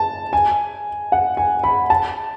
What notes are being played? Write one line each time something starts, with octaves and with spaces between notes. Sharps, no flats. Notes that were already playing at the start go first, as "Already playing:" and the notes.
Already playing: A5
G#5
F#5
G#5
B5
A5